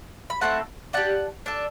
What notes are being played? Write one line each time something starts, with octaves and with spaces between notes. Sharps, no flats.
B5
A3 C4 E4 A4 F#5 A5
D4 G4 F#5 A5
D4 A4